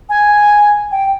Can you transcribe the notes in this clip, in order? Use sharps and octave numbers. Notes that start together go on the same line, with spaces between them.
G#5
G5